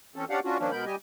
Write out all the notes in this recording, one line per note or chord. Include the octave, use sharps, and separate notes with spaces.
E3 C4 C#4 A4
C#4 D4 G4 D5 F5 F#5
C#4 D4 F4 F#4
D#3 F3 A#3 C#4 D4
B2 G#3 B3 A#4 B5 G6
G3 G4 D#5 G#5